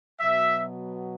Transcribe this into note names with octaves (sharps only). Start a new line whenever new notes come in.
B2 F#3 B3 E5